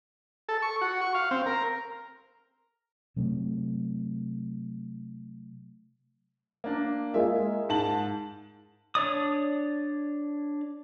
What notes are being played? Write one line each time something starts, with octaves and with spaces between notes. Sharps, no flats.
A4
C#6
F#4
C#6
F5
C4
A#4
C3 F#3 A3
A#3 D4
G#3 A#3 F4 E5
G#2 A5 F#7
D4 C#5 D5 D#6